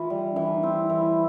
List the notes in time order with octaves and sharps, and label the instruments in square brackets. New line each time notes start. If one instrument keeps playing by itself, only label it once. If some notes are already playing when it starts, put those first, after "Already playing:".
Already playing: [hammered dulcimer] E3 [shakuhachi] F4
[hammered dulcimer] G3
[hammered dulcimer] E3 [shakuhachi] C#4
[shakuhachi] D4
D#4
[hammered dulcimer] C4 [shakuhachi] E4
[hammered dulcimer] E3